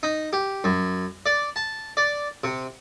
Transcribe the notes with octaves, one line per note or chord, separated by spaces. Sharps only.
D#4
G4
F#2
D5
A5
D5
C3